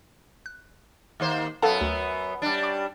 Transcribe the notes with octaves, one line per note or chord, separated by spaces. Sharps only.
F#6
D#2 A#3 C5
F#2 B3 A4 F5 A5
D2
G3 D4
C#6 D6